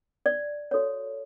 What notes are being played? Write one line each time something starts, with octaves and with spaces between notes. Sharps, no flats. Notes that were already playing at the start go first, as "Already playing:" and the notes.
D5
F#4 A4 C#5